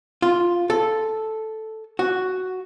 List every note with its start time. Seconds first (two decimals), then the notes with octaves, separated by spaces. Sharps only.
0.22 F4
0.70 A4
1.99 F#4